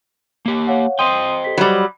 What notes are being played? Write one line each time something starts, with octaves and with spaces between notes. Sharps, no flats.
A#3 G4
C#5 F5 F#5
C5 D#5 G5 C6 D#6 D#7
G4 A4 B6
F#3 G3 B5